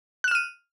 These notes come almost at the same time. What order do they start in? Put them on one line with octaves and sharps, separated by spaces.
F#6 E7 F6 D#7